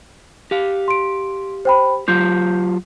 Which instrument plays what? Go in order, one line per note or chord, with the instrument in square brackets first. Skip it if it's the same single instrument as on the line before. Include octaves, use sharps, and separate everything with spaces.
[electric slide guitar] G4 F5
[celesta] C6 D7
C5 G5 B5
[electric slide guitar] F#3 F4 G4 [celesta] G6